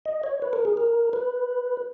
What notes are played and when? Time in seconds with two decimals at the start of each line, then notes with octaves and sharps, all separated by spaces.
0.06 D#5
0.23 C#5
0.42 B4
0.53 A#4
0.65 G#4
0.77 A#4
1.13 B4